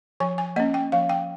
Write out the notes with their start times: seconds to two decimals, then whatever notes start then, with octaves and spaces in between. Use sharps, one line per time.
0.20 F3 G#5
0.38 G#5
0.56 A#3 C#4 D#5
0.74 G5
0.92 F3 F5
1.09 G5